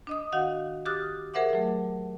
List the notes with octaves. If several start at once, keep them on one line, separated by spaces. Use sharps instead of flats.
D4 D#5 D#6
D#3 F#4 D#5 F5 F#5
G4 D6 D#6 F6 F#6 A6
G#4 A#4 C5 E5 F#5 D6
F#3 A3